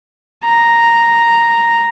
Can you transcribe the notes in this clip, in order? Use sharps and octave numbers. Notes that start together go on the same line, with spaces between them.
A#5